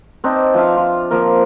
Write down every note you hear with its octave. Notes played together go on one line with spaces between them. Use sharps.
C4 D4 D#4
F3 D4 E5 F5
F4
F3 A#3 A#4